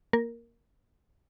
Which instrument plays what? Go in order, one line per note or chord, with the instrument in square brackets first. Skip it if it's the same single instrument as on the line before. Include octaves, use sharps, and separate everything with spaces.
[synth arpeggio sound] A#3 A#4